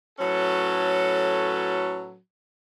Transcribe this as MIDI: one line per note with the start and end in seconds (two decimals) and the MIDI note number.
0.19 2.16 45
0.19 2.16 54
0.19 2.16 61
0.19 2.16 69
0.19 2.16 71